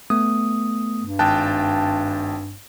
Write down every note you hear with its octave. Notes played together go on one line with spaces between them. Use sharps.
A3 B3 D#6
G2
G#1 G5 A5 F#6